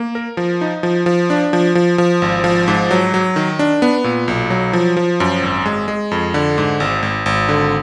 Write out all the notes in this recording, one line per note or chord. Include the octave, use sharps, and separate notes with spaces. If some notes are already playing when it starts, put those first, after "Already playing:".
Already playing: A#3
A#4
F3
D#4
F3
F3
D4
F3
F3
F3
G#1
F3
G#2
F#3
F#3
D#3
D4
B3
A#2
B1
F#3
F3
F3
F#2
G#1
G#3
G#3
F2
D3
G#2
G#1
G#1
G#1
D3